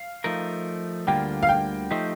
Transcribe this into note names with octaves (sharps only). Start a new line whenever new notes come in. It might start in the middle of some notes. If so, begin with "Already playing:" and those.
Already playing: F5
F3 A3 D#4 A#4
D2 D3 G3 A#3 F4 G5
F5
G5
F3 A3 D#4 G4 C5